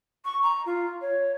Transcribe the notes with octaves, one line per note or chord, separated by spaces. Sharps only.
C#6
A#5
F4
C#5